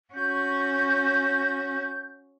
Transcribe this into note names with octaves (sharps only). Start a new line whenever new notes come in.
C#4 F#4 G6